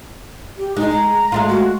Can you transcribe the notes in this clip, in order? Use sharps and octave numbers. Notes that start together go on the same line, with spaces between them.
G4
G#3 D#4
A#5
G#3 A3 F4
F#4